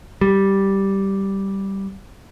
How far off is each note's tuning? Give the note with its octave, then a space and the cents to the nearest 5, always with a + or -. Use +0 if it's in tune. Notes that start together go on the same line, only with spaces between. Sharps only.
G3 -5